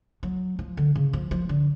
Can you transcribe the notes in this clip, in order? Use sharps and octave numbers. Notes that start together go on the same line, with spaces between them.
F#3
F3
D3
C#3
F3
F3
D3